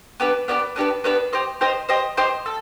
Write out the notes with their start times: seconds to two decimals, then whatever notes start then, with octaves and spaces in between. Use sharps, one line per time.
0.20 B3 D4 G4 B4
0.48 B3 D4 G4 B4
0.76 B3 D4 G4 B4
1.04 B3 D4 G4 B4
1.33 G4 C5 D#5
1.61 G4 C5 D#5
1.89 G4 C5 D#5
2.17 G4 C5 D#5
2.46 A4